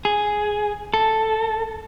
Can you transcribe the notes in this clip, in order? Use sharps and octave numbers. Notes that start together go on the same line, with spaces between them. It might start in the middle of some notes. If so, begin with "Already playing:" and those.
G#4
A4